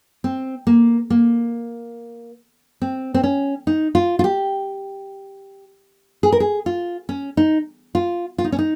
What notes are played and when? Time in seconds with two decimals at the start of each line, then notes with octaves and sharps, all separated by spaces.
0.24 C4
0.67 A#3
1.10 A#3
2.82 C4
3.14 C4
3.23 C#4
3.67 D#4
3.95 F4
4.19 F4
4.24 G4
6.23 G#4
6.32 A#4
6.40 G#4
6.66 F4
7.09 C#4
7.37 D#4
7.95 F4
8.38 F4
8.44 D#4
8.52 C#4
8.59 D#4